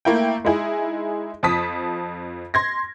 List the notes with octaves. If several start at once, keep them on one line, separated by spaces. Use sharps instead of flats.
A3 A#3 E4 G5
G#3 D#4 E4 G#4
F2 F3 A5 D#6 B6
C6 G#6 A#6